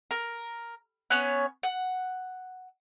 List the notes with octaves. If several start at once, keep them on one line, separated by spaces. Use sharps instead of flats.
A#4
B3 C#4 C#5 F#6
F#5